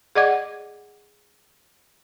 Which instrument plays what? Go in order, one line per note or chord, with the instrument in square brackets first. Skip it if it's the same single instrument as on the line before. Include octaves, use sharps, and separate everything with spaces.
[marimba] G#4 D5 D#5 F#5 D6 G#6